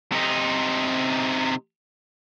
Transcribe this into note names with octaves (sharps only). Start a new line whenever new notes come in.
C3 D#4